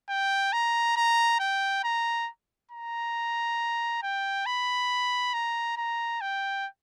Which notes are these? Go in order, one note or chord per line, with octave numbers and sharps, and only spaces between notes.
G5
A#5
A#5
G5
A#5
A#5
G5
B5
A#5
A#5
G5